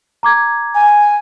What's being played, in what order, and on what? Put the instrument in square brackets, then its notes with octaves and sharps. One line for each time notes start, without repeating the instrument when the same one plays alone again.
[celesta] A#5 D6 G#6
[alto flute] G#5